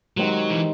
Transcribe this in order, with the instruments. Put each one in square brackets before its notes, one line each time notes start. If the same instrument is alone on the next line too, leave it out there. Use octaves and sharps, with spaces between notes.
[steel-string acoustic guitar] D#3 G#3 C4 D#4 G4 [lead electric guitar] F#3
[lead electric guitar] E3